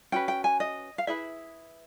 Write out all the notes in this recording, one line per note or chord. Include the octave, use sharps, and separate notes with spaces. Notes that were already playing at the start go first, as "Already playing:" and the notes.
C#4 F#4 B4 G5
G5
G#5
D#5
F5
E4 G#4 B4 E5